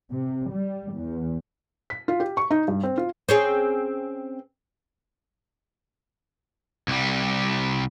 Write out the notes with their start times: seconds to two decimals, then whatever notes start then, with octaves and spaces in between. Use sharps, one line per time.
0.11 C3
0.52 G3
0.93 E2
1.90 B6
2.08 F4
2.20 G4
2.37 C#6
2.51 D#4
2.68 G2
2.83 C4
2.97 F4
3.29 C4 C#4 G#4
6.88 C2 G3